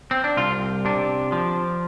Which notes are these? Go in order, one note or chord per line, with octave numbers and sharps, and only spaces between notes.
C4
D4
C2 F4
C3 D4
F3